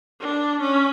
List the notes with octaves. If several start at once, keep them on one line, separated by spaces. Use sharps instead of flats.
D4
C#4